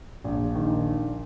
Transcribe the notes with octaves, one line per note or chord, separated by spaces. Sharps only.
A#1
D#3